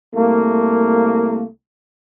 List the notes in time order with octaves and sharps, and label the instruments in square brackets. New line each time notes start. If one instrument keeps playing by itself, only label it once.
[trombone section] C2 A3 A#3